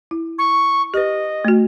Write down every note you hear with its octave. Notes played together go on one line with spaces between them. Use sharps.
E4
C#6
G4 B4 D#5
A3 F#4